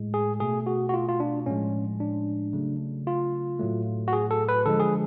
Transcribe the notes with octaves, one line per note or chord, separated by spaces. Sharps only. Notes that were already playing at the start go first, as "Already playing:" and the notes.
Already playing: A2 G#3
G#4
B2 A3 G#4
F#4
F#4
F4
F4
D4
A2 F3 G#3 C#4
D4
C#3 F#3 A3
F4
A2 F#3 A3
F#4
G#4
A4
B4
D3 F3 G#3 A4
G#4